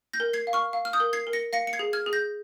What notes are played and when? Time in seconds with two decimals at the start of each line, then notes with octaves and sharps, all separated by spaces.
0.13 G6 A#6
0.20 A#4
0.33 G#6 C7
0.47 F5
0.53 C#6 F6
0.73 F5
0.85 F6
0.93 D#6 G6
1.00 A#4
1.13 G#6 C7
1.27 A#4
1.33 A#6 C#7
1.53 F5 A#6 C#7
1.67 C#7
1.73 G#6 C7
1.79 G#4
1.93 F6 G#6
2.06 G#4
2.13 G6 A#6